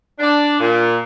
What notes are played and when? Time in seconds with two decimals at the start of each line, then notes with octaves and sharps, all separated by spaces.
0.19 D4
0.60 A#2